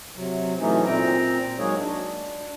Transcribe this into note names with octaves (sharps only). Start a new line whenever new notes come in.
C3 F#3
C3 E3 F#3 A3 C#4 D#4
A#2 C4 G5 A#5
F#3 G#3 A#3 D#4 G#4 C#5
D4